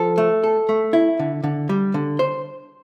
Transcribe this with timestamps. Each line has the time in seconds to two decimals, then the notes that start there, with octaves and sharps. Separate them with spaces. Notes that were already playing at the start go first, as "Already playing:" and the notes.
Already playing: F3 A4
0.18 A3
0.44 A4
0.69 A3
0.93 E4
1.19 D3
1.44 D3
1.69 G3
1.94 D3
2.19 C5